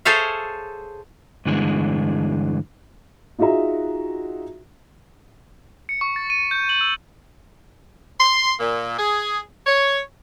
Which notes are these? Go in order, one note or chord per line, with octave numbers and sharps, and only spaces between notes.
G#4 A4 C5 C#5 E5 F5
G2 D3 E3 G#3
D#4 F4 F#4 G#4 E5 A#5
C#7
C#6
A6
D#7
G6
F#7
E6
C6
A#2
G#4
C#5